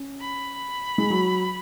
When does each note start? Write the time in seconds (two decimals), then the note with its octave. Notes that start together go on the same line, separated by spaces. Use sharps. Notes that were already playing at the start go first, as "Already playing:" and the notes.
Already playing: C#4
0.20 B5
0.98 G#3
1.10 F#3